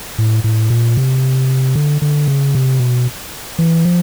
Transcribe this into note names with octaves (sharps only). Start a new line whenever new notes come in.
A2
A2
A#2
C3
D3
D3
C#3
C3
B2
E3
F3